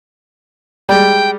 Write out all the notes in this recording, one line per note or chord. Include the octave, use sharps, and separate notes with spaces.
G3 G#3 G5